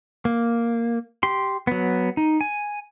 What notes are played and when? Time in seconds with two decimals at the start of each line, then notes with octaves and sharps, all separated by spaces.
0.25 A#3
1.23 G4 C6
1.67 F#3 B3
2.17 D#4
2.41 G#5